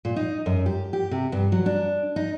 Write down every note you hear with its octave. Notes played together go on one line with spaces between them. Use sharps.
A#2
D#4
F#2
G4
G4
C3
G2
F#3
D4
D#4